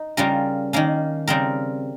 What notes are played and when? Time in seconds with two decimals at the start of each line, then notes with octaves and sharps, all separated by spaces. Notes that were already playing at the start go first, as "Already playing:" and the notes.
Already playing: D#4
0.17 C#3 G3 C#4 F4 A#4
0.73 D#3 A#3 C#4
1.27 C#3 G3 C4 A#4